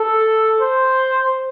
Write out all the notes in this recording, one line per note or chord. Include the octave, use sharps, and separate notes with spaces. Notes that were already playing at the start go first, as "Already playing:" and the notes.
Already playing: A4
C5